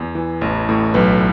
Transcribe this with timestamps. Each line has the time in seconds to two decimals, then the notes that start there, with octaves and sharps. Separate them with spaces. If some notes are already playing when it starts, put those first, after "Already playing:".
Already playing: E2
0.15 E3
0.41 A1
0.69 A2
0.94 B1 B4